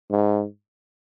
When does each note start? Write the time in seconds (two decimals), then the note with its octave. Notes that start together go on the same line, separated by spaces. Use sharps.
0.11 G#2